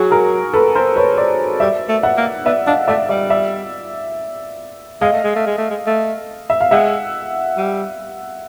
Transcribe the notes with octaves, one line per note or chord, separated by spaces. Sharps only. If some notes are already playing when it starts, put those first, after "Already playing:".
Already playing: F#3 F#4 G#4
G#4 A#4
A4 B4
A#4 C5
B4 C#5
C5 D5
G3 D5 E5
A3
E5 F#5
A#3
B3 D5 E5
D4 D#5 F5
A3 D5 E5
G3 D5 E5
D5 E5
G#3 D#5 F5
A3
G#3
A3
G#3
A3
G#3
A3
E5
F5
G#3 E5 F#5
G3